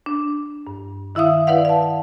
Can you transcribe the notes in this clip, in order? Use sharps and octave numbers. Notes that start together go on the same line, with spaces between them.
D4
G2
D#3 E4 E5 F5 D#6
E4 B4 D5 F5 F#5
F5 A5